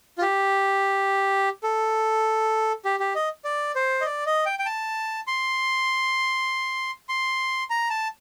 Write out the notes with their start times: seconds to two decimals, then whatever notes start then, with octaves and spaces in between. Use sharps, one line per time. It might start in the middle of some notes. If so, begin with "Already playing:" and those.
0.18 F4
0.22 G4
1.63 A4
2.85 G4
3.00 G4
3.15 D#5
3.45 D5
3.76 C5
4.01 D#5
4.06 D5
4.26 D#5
4.46 G5
4.59 G5
4.66 A5
5.27 C6
7.09 C6
7.70 A#5
7.90 A5